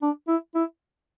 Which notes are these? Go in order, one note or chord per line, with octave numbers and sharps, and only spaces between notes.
D4
E4
E4